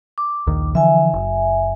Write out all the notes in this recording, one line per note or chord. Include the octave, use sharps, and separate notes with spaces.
D6
A#1 D#2 D#3
D3 E3 F3 E5 G#5
F#1